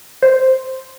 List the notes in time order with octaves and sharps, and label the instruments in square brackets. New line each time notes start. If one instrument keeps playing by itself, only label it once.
[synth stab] C5